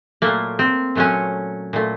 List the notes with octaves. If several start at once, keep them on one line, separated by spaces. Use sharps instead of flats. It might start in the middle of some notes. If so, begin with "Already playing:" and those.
A#2 F#3 A3 A#3
C4
A#2 F#3 A3 C#4
A#2 A3